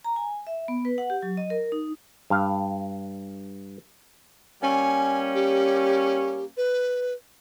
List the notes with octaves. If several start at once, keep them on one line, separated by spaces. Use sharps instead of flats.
A#5
G#5
E5
B3
B4
F#5
G4
F#3
D#5
A#4
D#4
G2 F5
G3 A#3 C#4 G#5
G4
B4